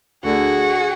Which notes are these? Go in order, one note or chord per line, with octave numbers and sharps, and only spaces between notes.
D2 D3 F#4 G#4